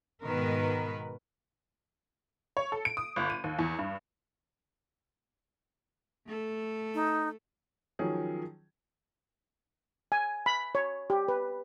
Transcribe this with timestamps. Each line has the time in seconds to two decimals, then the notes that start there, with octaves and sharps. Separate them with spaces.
0.24 G#2 B2 D#3 A#4 B4
2.57 C#5
2.72 A4
2.85 D7
2.97 D#6
3.16 G1
3.30 D#7
3.44 D#2
3.59 E2
3.79 G2
6.27 A3 A4
6.94 D#4
7.99 D#3 F3 F#3 C#4 G#4
10.12 G#5
10.46 B5
10.75 C#5
11.10 G4
11.28 B4